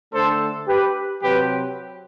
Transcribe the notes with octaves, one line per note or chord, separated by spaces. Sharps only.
D3 A3 D4 A4 C5
G4 B4
C3 F#3 C4 G4 B4